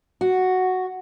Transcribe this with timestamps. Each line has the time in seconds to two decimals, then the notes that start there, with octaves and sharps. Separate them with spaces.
0.21 F#4